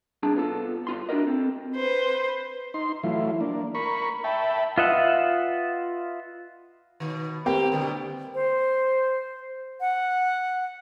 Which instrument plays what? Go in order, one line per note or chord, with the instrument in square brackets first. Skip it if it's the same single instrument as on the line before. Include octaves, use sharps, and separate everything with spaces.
[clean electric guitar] C2 D4 G#4 A5
B3 F4 A4
G2 F4 C6
D4 E4 F#4 A#4 D#5
C4 A4
[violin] B4 [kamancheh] C5
[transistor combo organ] D#4 C6
E3 F#3 A3 E4 F4
A#3 D4
A#4 B5 C#6
E5 G5 A5 B5
[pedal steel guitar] F4 B4 D#5 E5 F#5
[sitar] B2 D#3
[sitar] A3 G4 [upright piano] A#3 C4 G5
[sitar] B2 D3 G3
[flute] C5
F#5